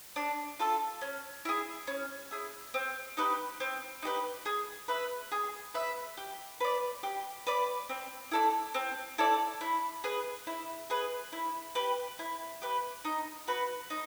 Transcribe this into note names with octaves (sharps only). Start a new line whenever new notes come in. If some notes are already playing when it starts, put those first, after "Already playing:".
D4
F4 A4
C#4
E4 G#4
C#4
E4 G#4
C4
D#4 G4 B4
C4
D#4 G4 B4
G#4
B4 E5
G#4
B4 E5
G4
B4 D5
G4
B4 D5
C4
E4 A4 D5
C4
E4 A4 D5
E4
G#4 B4
E4
G#4 B4
E4
G4 B4
E4
G4 B4
D#4
F#4 B4
D#4